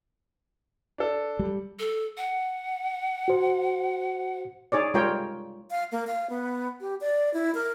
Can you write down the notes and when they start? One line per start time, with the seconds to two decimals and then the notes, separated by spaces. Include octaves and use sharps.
0.98 D4 A4
1.39 G3
1.79 A4
2.17 F#5
3.28 F#4 C5
4.72 D#4 G#4 C#5 D5
4.94 G3 G#3 F4 A#4 C#5 G5
5.71 F5
5.92 A#3
6.07 F5
6.30 B3
6.81 G4
7.01 D5
7.34 E4
7.55 A#4